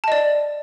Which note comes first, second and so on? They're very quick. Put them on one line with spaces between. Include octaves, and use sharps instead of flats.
A5 D#5 D5